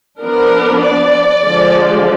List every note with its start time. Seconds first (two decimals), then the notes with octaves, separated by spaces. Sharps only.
0.21 F3 B3 D4 A#4
0.83 D5
1.44 D3 F3 G#3